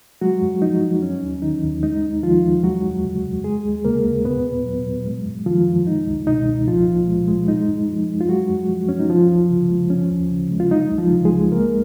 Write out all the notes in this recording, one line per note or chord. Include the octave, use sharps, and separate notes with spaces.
F#3 G#3 F#4
F#2
F3 D#4
F#2
F#3 C#4
D#2
D#3 D#4
D#2
G#3 D#4
D#2
D#3 F3 F4
D#2
F#3 G#3 F#4
F2
C#3
F2
G#3 G#4
D#2
C#3 A#3 A#4
D#2
A#2 B3 B4
A#2
F#3
F#3
G#3
F#2
D#3 F3 F4
F#2
G#3 D#4
C#2
B2 D#4
C#2
A#2 F3 F4
A#2
G#3
G#3
G#3 D#4
F#2
F3
F#2
F4
F#3 G#3 F#4
F#2
F3
F#2 C#4
D#4
F3 F4
C#2
C#3
G#3
F3 C#4
D#2
C#3
G#3
F4
F#3 D#4
C#2
F3 F4
C#3
G#3 G#4
C#2
G#3 A#3 A#4